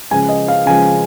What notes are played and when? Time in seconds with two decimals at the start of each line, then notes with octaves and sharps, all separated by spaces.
0.11 C#3 F3 G#3 G#5
0.29 D#5
0.48 F5
0.66 C#3 F3 G#3 G#5